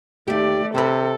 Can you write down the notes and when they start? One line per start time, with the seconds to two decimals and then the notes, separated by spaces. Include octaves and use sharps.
0.28 D#2 A3 G4 D5
0.75 C3 C4 A4 B4